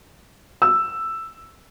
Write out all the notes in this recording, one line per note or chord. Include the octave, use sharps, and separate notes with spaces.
E6